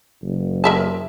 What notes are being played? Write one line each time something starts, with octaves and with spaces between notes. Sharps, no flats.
F#1
A#4 E5 A5